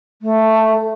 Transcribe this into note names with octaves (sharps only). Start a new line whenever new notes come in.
A3